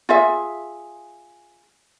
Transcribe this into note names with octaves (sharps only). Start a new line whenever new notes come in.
F4 G#4 E5